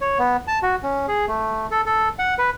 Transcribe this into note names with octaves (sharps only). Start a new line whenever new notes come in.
C#5
B3
A5
F#4
C#4
G#4
A3
A4
A4
F#5
B4